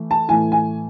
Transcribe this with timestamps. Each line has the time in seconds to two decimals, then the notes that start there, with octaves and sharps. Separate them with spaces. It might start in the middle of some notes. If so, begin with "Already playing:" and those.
Already playing: E3 A3
0.11 A5
0.28 A2 E3 A3 G#5
0.52 G#5